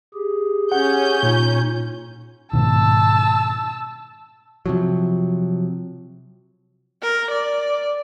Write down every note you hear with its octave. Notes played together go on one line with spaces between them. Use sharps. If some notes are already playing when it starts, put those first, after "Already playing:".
G4 G#4
C#4 F#5 G6
A#2 D#4 F4
G#2 B2 D#3 A5 E6
C3 F3 F#3
A#4
D5